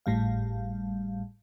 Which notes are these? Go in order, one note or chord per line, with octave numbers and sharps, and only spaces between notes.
G#1 A2 G3 F5